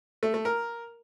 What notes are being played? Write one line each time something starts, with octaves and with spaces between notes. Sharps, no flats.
A3
A3
A#4